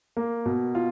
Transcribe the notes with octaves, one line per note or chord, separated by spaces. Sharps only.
A#3
B2
F4